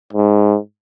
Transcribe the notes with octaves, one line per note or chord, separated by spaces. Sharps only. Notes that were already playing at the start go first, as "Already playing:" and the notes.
G#2